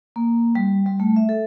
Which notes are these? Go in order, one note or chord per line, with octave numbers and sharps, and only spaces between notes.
A#3
G3
G3
A3
E5
A4